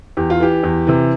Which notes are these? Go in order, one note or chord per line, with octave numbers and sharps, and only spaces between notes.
E2 G4
F4
E3 G4
E2
C3 E3